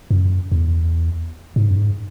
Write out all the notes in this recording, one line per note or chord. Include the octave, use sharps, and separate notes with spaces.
F#2
E2
G#2
F#2
G#2